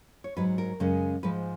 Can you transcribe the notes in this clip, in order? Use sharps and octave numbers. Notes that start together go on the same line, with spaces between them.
C#5
G#2 F#3 B4
A#4
F#2 C#3 G#3
G#2 F3 G#3 B4